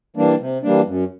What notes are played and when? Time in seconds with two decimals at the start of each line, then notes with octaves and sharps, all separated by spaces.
0.16 E3 G3 A#3 D4
0.40 C3
0.63 E3 G3 A#3 D4
0.86 F#2